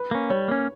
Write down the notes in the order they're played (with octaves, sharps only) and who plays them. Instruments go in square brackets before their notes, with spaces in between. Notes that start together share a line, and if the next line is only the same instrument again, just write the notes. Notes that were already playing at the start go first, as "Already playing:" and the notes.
Already playing: [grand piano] B4
[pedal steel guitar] A#3 C#4
[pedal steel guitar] G3 [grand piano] C#5
[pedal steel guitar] A#3 C#4